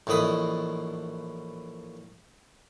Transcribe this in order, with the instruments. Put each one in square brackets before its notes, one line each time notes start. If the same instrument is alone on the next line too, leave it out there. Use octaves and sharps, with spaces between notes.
[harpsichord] A#1 A2 E3 D#5 B5